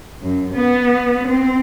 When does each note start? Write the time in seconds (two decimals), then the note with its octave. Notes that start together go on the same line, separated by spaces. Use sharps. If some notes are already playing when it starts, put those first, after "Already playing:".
0.22 F#2
0.55 B3
1.28 C4